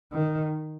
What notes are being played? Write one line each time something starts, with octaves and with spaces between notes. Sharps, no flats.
D#3